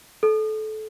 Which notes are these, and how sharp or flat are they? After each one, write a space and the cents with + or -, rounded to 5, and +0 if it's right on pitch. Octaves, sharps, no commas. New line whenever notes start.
A4 -25